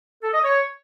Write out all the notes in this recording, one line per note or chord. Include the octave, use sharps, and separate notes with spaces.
A4
D#5
C#5